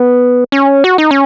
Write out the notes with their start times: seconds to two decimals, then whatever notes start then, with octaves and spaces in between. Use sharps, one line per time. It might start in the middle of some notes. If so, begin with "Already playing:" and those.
Already playing: B3
0.52 C#4
0.84 F#4
0.98 D#4
1.11 C#4